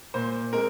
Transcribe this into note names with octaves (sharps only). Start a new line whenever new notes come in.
A#2 C5
G#3 C4 A#4